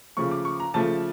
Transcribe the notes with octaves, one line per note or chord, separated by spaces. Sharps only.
C#3 F3 A3 C#6
D6
C#6
A#5
C#3 F3 A3 A5